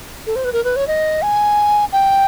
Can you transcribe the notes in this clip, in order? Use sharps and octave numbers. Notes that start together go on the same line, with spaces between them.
A4
C5
B4
A#4
B4
C#5
D#5
G#5
G5